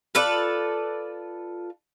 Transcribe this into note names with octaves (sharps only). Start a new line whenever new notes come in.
F4 A4 B4 D5